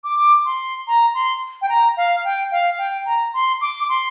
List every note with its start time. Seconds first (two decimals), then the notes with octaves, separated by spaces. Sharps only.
0.04 D6
0.45 C6
0.87 A#5
1.14 C6
1.62 G5
1.69 A#5
1.97 F5
2.24 G5
2.51 F5
2.78 G5
3.06 A#5
3.34 C6
3.61 D6
3.89 C6